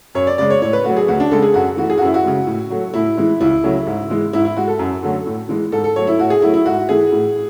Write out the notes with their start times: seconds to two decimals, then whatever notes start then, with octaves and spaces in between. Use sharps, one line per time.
0.15 F#2 C#5
0.27 D5
0.38 C#3 G#3 D5
0.50 C#5
0.62 A2 C#5
0.73 B4
0.84 F#3 A3 F#4
0.97 G#4
1.08 D2 F#4
1.20 D4
1.31 C#3 G#3 A4
1.42 G#4
1.54 F#2 F#4
1.77 E3 A3 F#4
1.90 G#4
1.98 F#4
2.01 F#2 E4
2.14 F#4
2.24 C#3 G#3
2.47 A2
2.70 F#3 A3
2.94 A2 E4
3.17 E3 G#3
3.41 C#2 E4
3.64 C#3 F#3 A3
3.87 G#2
4.10 E3 G#3
4.33 G#2 E4
4.45 E4
4.57 G#3 F#4
4.68 A4
4.79 F#2
5.03 D3 F#3 A3
5.26 A2
5.49 E3 G#3
5.72 G#2 A4
5.84 A4
5.96 F#3 A3 C#5
6.07 E4
6.19 A2 F#4
6.30 G#4
6.42 F#3 A3 E4
6.54 E4
6.66 G#2 F#4
6.89 E3 A3 G#4
7.12 A2